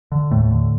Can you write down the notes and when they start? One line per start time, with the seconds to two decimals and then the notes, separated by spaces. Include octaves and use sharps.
0.12 D3
0.31 D#2 A2 A3
0.51 D3